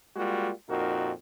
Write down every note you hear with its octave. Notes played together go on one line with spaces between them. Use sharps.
G3 G#3 A#3 F4 F#4
F2 A#2 D#4 F#4 A#4